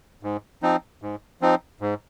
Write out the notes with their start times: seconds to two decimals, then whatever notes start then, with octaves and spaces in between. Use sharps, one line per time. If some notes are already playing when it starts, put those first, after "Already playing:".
0.23 G#2
0.63 F3 C4 D#4
1.02 G#2
1.41 F3 C4 D#4
1.81 G#2